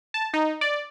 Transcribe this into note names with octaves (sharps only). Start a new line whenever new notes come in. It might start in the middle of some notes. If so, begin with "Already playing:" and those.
A5
D#4
D5